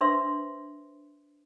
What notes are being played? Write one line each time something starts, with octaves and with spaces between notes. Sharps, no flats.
D4 B4 C5 E5 C6 E6